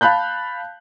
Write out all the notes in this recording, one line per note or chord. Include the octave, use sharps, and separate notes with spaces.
F5 A5 B5 F#6 G6